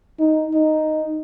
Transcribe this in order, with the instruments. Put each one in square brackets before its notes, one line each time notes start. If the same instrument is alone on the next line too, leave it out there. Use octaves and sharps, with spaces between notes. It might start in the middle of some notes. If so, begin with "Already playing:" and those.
[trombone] D#4
D#4